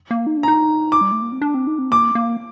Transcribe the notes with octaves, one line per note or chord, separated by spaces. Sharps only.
A#3
D#4
D4
D#4 A#5
D6
G3
A3
A#3
C4
D4
C4
D#4
C4
A#3 D6
A#3